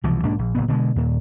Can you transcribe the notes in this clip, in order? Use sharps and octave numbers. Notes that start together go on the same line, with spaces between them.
C2 B2 E3 F3
B1 G#2 A#3 D4
A#1
F#1 A#2 B3
B2 D3 F3 G#3
D#2 A#2